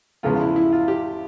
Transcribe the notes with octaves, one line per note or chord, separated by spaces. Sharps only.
E2 C#3 F3 G#3 B3 F4
E4
E4
F4
G4